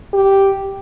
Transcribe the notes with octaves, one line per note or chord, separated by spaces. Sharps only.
G4